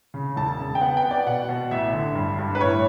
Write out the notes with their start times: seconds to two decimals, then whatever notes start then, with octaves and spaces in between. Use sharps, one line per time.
0.14 C#3
0.36 E1 A5
0.59 C#3
0.75 G5
0.81 B3 F#5
0.97 G5
1.03 B3
1.11 D5
1.26 B2 F#5
1.49 B2
1.71 A1 E5
1.93 D3
2.15 G2
2.38 G2
2.55 B4
2.60 A2 C#5